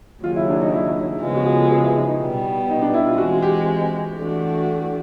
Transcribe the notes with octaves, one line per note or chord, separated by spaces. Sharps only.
D#2 C#3 F#3 F4
E4
D4
D#4
E4
D#4
C#3 F3 G#3 B3 F4
F#4
G#4
A4
G#4
E4
D#4
D#4
B2 G3 B3
D#4
D4
E4
F4
E3 G#3 C4 F#4
G4
E3 A3 D4 F#4